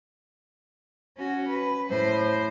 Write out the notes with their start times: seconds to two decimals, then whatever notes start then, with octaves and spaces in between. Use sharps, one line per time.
1.16 C#4 F#4
1.48 B4
1.89 A2 C5